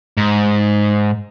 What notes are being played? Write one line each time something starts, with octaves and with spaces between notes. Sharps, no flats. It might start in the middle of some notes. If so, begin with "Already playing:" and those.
G#2